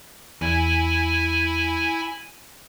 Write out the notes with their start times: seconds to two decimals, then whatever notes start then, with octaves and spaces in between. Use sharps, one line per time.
0.41 E2 E4 G#5